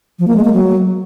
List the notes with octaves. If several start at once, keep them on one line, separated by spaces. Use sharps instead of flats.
F3
A#3
G#3
A#3
F#3